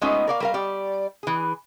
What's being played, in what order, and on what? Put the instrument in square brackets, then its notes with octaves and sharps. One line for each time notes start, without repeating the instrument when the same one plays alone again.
[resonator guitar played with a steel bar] G#3 A3 B3 C#4 D#4 F4
A#4 D5 F5
G3 A#4 F5
G3 D5
E3 G#4